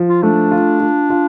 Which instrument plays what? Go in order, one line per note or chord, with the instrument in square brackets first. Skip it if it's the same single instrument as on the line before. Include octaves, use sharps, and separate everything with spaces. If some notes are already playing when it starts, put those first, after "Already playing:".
Already playing: [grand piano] F3
[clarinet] F4
[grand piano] A3 [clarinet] D4
[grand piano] F4
F4
F4